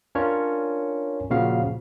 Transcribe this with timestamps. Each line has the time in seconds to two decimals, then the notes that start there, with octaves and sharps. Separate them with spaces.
0.15 C#4 D4 F4 A#4 C#5
1.30 A#2 C#3 F3 F#4 F5